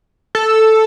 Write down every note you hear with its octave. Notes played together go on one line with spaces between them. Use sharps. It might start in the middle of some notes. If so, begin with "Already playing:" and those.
A4